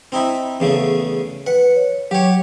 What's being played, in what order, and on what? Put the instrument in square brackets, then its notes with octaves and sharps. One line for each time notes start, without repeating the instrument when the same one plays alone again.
[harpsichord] C4 D#4 E4
E2 C#3 A3
[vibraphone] B4 [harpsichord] F#5
[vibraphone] C#5
[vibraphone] F#3 [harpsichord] G4 C#5